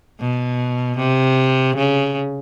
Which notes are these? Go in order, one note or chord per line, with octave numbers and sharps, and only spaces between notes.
B2
C3
C#3